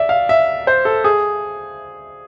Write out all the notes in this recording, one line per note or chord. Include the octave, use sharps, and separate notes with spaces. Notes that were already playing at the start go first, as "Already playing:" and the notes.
Already playing: D5 E5
F5
E5
C5
A4
G#4